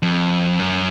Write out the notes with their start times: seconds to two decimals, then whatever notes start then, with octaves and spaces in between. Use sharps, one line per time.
0.02 F2
0.59 F#2